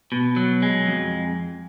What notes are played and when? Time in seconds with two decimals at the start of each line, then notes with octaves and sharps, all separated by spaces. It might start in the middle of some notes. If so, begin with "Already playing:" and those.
0.12 B2
0.36 F#3
0.62 G#3
0.87 F2